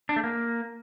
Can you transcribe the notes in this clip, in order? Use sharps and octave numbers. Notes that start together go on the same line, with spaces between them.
D4
A3
A#3